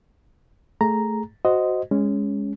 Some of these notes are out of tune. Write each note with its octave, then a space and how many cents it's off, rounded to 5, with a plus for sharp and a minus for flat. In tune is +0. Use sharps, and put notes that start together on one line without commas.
A3 +0 G#4 +0 A#5 +0
F#4 +0 C5 -15 D#5 +0
G#3 -10 C#4 +5